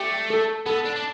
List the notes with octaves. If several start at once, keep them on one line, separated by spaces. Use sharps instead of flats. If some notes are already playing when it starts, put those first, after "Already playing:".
Already playing: A3 G4
A4
B3 A4
D4
D4